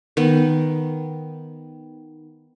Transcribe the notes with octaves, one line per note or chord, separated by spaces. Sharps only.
D#3 B3